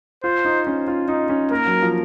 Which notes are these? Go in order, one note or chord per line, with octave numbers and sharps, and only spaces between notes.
F4 C5
D#4
C#4
F4
D#4
C#4
A#3 A#4
F#3
F3